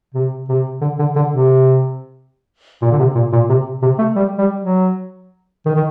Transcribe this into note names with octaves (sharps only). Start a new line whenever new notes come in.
C3
C3
D3
D3
D3
C3
A#2
D3
C3
A#2
A#2
C3
C3
A3
G3
G3
F#3
D#3
D#3